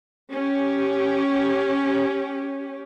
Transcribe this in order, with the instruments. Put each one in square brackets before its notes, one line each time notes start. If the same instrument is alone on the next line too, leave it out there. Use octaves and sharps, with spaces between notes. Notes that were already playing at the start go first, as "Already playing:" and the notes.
[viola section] C#4 G4